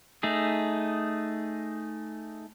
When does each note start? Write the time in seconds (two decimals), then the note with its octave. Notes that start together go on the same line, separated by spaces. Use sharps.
0.23 A3 D#4 G#4